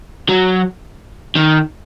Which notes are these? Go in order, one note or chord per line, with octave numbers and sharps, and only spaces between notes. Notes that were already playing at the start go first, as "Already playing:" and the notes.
F#3
D#3